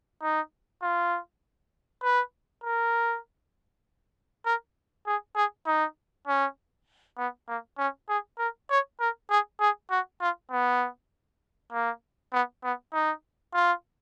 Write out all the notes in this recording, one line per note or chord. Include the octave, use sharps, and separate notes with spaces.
D#4
F4
B4
A#4
A#4
G#4
G#4
D#4
C#4
B3
A#3
C#4
G#4
A#4
C#5
A#4
G#4
G#4
F#4
F4
B3
A#3
B3
B3
D#4
F4